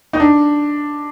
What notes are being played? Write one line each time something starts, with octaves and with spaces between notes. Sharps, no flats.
D#4
D4